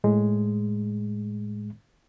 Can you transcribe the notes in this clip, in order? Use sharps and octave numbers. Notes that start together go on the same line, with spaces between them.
A2 G#3